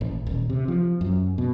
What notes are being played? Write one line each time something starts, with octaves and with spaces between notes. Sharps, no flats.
A1
D#1
C3
F3
F#2
B2